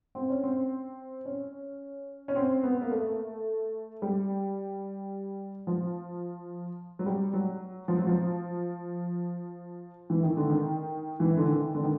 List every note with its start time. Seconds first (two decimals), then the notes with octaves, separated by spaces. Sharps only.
0.15 C4
0.30 C#4
0.43 C4
1.25 C#4
2.28 C#4
2.36 C4
2.63 B3
2.82 A#3
2.92 A3
4.02 G3
5.67 F3
6.99 F#3
7.06 G3
7.34 F#3
7.88 F3
7.98 F#3
8.07 F3
10.10 E3
10.23 D#3
10.37 D3
10.50 D#3
11.20 E3
11.37 D3
11.47 D#3
11.75 D3
11.83 D#3